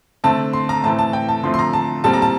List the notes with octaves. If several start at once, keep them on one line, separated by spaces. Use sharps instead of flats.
D3 A3 C4 A5
C6
A#5
A2 E3 A3 C4 A5
A5
G5
A5
D3 F3 A3 C4 C6
C6
A#5
A5
A#2 G3 C4 A5
A#5
A5